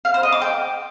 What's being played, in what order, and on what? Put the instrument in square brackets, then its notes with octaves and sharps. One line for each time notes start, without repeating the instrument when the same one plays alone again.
[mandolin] F5
C5
D#5
D6
G5